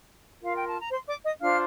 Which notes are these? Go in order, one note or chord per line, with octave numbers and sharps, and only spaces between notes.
F4 A#4 F5
G5
A5
A#5
C5 C6
D5 D6
D#5 D#6
D4 F4 C5 F5 F6